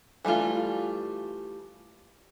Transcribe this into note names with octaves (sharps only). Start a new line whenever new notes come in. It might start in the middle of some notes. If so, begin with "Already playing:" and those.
E3 G3 A3 F4